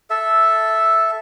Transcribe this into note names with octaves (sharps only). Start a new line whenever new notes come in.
A4 E5